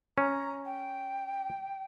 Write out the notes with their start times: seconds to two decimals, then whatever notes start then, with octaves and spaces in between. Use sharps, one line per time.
0.18 C#4 A#5
0.65 G5